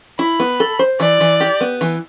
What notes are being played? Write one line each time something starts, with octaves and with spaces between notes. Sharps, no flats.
E4 B5
B3
A4
C5
E3 D5
E3
G4
B3
E3